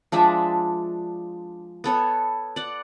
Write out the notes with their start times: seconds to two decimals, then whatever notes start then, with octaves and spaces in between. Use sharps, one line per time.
0.12 F3 G#3 D4 E5
1.84 B3 A4 C#5
2.56 D5 F#5